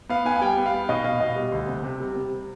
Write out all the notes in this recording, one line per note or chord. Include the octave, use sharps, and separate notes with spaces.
B3 F5
B3 G#5
G#5
G3 G5
B3
F5
B3
B2 D#5
B2 F5
B2 D#5
G3
D2
C3
C3
G3
C3